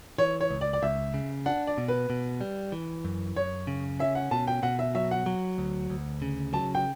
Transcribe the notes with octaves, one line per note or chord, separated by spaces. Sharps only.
E3 C#5
C#5
C#2
D5
D5
C#2 E5
C#3
D4 F#5
D5
B2
B4
B2
G3
E3
F#2
F#2 C#5
C#3
C#4 E5
F#5
B2 A5
G5
B2 F#5
E5
F#3 E5
F#5
F#3
D2
D2
C#3
F#3 A5
G5